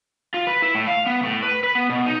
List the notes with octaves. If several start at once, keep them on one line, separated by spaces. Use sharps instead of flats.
F4
B4
E4
A2
F5
B3
A2
B4
B4
B3
B2
D#4